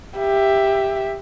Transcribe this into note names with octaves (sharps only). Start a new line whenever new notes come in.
G4 E5